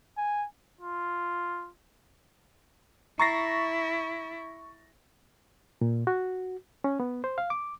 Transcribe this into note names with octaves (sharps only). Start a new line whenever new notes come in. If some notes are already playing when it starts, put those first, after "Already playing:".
G#5
F4
E4 A#5 C#6 A6 A#6 C7
A#2
F#4
C#4
B3
C5
F5
D6